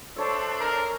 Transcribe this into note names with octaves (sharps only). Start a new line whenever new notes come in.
D4 A4 C5 C#5 E5
A#4